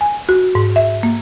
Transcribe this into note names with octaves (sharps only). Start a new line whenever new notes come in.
G#5
F#4
G#2
E5
A#3